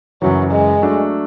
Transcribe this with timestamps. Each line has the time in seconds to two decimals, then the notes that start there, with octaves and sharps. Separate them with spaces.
0.22 F#2 C#3 E3 F#3
0.51 G#3
0.82 F#3 A3 D4 F#4